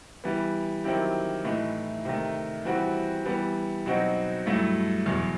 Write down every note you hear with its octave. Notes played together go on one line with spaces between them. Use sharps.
E3 G3 B3
D#3 F#3 C4 E4 G4
A2 E3 A3 D#4
C3 D#3 A3
E3 G3 C4 F#4
E3 G3 B3
B2 F#3 C4 D#4 F#4
G2 F#3 A3 E4
E2 B2 F#3